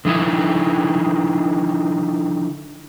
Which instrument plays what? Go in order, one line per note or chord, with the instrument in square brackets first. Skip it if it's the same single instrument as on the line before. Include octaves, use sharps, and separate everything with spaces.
[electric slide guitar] D3 F3 D#4 E4